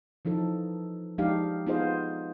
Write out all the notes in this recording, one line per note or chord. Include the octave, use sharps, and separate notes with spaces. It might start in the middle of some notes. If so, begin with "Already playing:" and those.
E3 F3 D#4 A4
F3 G#3 D4 D#4 G4 F5
B3 D#4 F4 G#4 C5 D#5